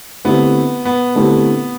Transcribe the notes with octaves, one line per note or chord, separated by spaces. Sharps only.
D3 A3 B3 C4 E4 G4
B3
D3 A3 C4 E4 G4